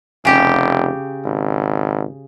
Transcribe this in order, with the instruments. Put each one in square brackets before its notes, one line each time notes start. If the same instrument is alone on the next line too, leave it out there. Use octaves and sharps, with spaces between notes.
[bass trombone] F1 [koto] C#3 G4
[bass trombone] G#1